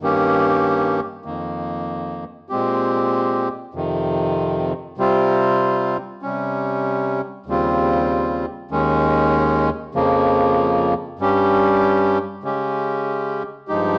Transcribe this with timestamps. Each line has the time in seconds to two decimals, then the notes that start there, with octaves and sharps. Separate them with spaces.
0.01 G2 D#3 A#3 C#4 G4
1.25 F2 D#3 A#3
2.49 A#2 G#3 C4 G4
3.74 F2 C3 D#3
4.98 C3 G3 C4 F4
6.22 C3 G3 C#4
7.46 D#2 C#3 G3 C4 F4
8.71 D#2 D#3 G#3 C#4
9.95 F2 C#3 F3 A#3
11.19 G2 G3 C#4 G4
12.44 C#3 G#3 C#4 G4
13.68 G2 F3 G#3 D#4 G4